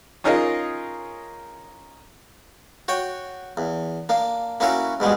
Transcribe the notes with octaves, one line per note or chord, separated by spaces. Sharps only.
C#4 D#4 F4 G#4 A#4 D#5
F#4 C#5 G5
E2
A#3 D4
A#3 C#4 E4 F#4 A#4
G#2 B2 G3 G#3